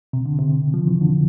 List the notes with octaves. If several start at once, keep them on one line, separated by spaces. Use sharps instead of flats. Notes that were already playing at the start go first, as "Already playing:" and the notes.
C3
D3
C3
F3
E3
D3